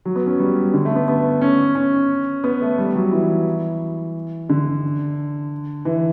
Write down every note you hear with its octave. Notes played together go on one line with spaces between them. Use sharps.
F#3
B3
C#4
G3
D3
A3
B3
B3
C#4
C#4
B3
A3
G3
F#3
E3
D3
E3